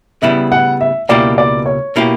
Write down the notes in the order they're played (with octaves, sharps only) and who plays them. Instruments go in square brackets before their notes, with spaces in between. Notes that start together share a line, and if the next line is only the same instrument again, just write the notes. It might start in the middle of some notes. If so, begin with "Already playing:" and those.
[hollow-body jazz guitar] C#3 G3 B3 E4 [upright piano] E5
[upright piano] F#5
E5
[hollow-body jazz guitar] C#2 B2 A#3 E4 G4 [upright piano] D5
[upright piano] D5
C#5
[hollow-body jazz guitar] B2 A#3 E4 G4